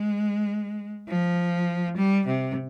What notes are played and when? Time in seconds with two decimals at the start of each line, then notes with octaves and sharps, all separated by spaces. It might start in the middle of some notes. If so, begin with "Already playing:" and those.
Already playing: G#3
1.08 F3
1.97 G3
2.27 C3